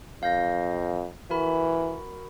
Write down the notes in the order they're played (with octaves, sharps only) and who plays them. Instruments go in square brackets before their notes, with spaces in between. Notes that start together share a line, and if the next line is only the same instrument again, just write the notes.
[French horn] F2 [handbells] F5 G6 A#6
[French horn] E3 [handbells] F#4 A#4 B5